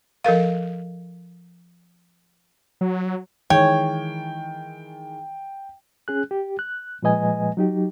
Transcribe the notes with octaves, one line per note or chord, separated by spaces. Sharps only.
F3 A4 A#4 F5
F#3
D#3 E3 G#3 C#5 G5
C#4 G#4 F#6
G4
F#6
A#2 F3 G#3 B4 D#5 G#5
F#3 D#4 G4